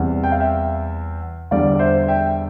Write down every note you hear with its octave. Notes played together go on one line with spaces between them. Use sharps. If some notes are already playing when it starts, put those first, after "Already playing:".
Already playing: E2 C3 G3
G5
F5
E5 G5
E2 D3 G3 D5 F5
D5
C5 E5
E5 G5